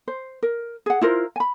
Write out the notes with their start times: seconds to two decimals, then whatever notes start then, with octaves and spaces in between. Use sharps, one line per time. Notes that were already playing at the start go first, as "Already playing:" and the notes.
0.08 C5
0.43 A#4
0.86 G#4 F#5
1.01 E4 F4 A#4 C5
1.36 G#5 B5